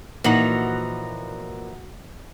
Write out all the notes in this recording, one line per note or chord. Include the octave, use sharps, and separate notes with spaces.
A#2 E3 F3 D#4 F#4